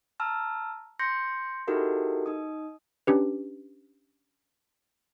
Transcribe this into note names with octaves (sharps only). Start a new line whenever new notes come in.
A5 A#5 E6 F6
C6 G6 A#6 C#7
D#4 E4 F#4 G4 A4 A#4
D#4 D#6
C#4 D4 G4 B4